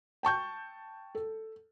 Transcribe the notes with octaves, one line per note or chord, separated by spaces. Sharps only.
G5 A5 C#6 G6
A4